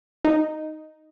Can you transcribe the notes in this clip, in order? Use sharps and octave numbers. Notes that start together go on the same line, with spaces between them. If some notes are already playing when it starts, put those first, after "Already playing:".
D#4